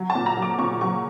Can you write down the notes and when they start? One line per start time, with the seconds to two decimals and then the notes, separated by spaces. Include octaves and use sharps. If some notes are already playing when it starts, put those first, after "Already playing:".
Already playing: F#3
0.10 A5
0.15 A#2
0.26 A#5
0.37 F#3
0.42 D6
0.59 A#2 C#6
0.81 F#3 C#6